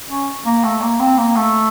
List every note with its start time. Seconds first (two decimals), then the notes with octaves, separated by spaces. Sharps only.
0.10 C#4
0.46 A#3
0.64 A3
0.82 A#3
1.00 C4
1.18 A#3
1.36 A3